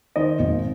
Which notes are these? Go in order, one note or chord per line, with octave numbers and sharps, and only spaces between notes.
D#3 C5 D#5
G#1